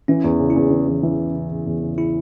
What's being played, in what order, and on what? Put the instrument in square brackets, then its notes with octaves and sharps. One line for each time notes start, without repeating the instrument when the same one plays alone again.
[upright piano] E3 [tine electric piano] C#4
[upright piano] E2
C#3
[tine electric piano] E4
[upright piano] E2
E3
E2
E3
C#3
C#3
C#3
E2
C#3
[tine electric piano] E4